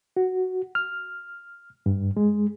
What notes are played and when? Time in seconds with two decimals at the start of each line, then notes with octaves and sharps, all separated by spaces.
0.17 F#4
0.75 F6
1.86 G2
2.17 G#3